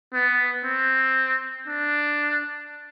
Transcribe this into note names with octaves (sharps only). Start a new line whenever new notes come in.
B3
C4
D4